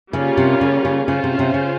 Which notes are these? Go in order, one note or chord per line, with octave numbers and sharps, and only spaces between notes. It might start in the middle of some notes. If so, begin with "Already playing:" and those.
C#3 G3 A#3 C#4 F4
C3
C#3
C#3
C#3 C#4 F4 C5
C3
C3
C#3